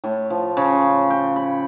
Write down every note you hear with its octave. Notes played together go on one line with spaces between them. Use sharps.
A2
F3
C#3
G5
B5